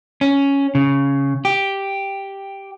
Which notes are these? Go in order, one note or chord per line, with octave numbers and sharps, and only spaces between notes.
C#4
C#3
G4